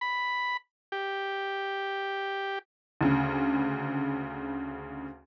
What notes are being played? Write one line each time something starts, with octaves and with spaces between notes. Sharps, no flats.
B5
G4
D2 C#3